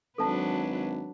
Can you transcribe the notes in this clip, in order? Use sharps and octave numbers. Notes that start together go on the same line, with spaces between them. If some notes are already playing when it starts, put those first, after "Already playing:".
G#1 F#3 D4 A4 B4 A5